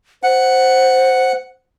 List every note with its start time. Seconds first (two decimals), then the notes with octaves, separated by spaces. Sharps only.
0.23 C5 F#5